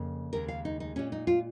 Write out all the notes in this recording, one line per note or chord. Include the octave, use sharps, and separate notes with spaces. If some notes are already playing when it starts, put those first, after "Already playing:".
Already playing: F2 C#3 A#3
D#2 C#3 G#3 A#4
F5
D#4
D#4
A#2 G#3 C#4
D#4
F4